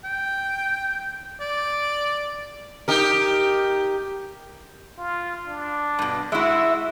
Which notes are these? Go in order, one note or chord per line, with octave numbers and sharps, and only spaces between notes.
G5
D5
D#4 G4 A#4
F4
D4
G2 B2
G#3 E4 F#4 E5